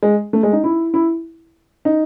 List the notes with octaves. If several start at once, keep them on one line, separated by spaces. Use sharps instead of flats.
G#3
A3
G#3
D#4
E4
E4
D#4